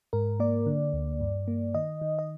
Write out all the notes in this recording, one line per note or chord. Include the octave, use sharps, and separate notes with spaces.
G#2 A#4
A#3 D5
D3
D2
G2
A#3
D#3 D#5
D#3
D#5